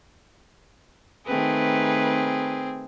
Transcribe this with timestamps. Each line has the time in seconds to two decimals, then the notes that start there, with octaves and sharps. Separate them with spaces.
1.27 D#3 A3 C4 G#4 B4